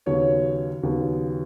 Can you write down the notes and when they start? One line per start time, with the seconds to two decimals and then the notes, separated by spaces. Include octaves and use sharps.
0.06 D#2 C#3 F#3 B3 C#5
0.83 D#2 C#3 F#3 B3